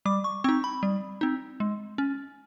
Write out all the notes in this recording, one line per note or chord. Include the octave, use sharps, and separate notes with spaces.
G3 D6
C#6
C4 D#4 C#6
B5
G3
C4 D#4
G#3
C#4